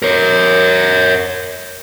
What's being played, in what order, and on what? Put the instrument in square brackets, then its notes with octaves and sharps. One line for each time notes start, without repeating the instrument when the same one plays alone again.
[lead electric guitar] A#4 C#5